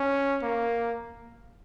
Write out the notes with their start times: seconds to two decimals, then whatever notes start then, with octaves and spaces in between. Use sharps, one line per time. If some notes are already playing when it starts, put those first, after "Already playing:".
Already playing: C#4
0.43 A#3